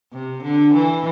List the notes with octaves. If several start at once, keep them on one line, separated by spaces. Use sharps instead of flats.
C3
D3
E3